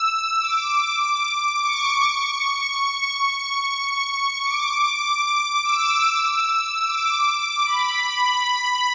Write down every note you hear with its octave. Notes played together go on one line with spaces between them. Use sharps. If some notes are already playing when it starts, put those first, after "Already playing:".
Already playing: E6
D6
C#6
C#6
D6
D6
E6
D6
B5